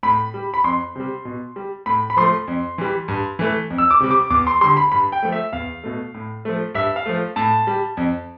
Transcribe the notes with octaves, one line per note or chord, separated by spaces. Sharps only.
A2 B5
G3
B5
F2 C6
C3 G3
B2
G3
A2 B5
B5
F3 A3 C6
F2
E3 G3
G2
E3 A3
F2
E6
D6
C3 G3
D6
E2 D6
C6
D3 G3 C6
B5
G2 B5
G5
F3 A3
E5
E2 F5
B2 A3
A2
F3 A3
G2 E5
F5
F3 A3
A2 A5
G3
F2